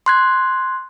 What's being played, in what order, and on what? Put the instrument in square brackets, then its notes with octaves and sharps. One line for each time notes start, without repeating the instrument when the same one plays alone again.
[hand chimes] C6 F#6 G#6